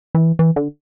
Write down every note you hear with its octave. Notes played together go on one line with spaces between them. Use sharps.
E3
E3
D3